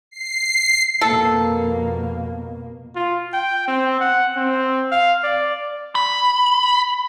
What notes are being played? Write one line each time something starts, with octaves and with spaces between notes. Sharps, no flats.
C7
F2 B2 A#3 A4
F4
G5
C4
F#5
C4
F5
D5
B5